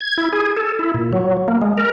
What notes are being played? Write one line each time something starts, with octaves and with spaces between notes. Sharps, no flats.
G#6
E4
G#4
A4
E4
A#2
F#3
A#3
G#3
A#4